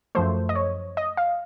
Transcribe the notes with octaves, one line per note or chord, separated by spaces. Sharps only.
F#2 F3 A3 C5
D#5
C#5
D#5
F5